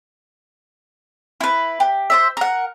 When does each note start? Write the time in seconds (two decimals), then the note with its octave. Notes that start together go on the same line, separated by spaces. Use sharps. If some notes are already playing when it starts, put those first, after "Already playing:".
1.41 E4 B4
1.80 G4
2.10 C5 D5 E5
2.37 A#4 F#5